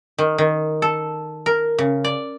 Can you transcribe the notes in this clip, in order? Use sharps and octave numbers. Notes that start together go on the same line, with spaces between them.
D#3
D#3
A4
A#4
C#3
D5